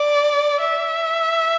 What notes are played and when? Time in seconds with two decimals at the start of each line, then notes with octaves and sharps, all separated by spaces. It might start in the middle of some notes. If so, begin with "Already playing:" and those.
Already playing: D5
0.60 E5